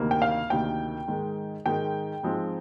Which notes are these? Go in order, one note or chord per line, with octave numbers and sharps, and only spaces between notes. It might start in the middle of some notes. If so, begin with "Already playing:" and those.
Already playing: D2 C3 D#3 A#3
G5
F5
D2 C3 D#3 A#3 G5
G#2 D#3 G#3
G#2 D#3 G#3 G5
G#2 F3 G#3 C4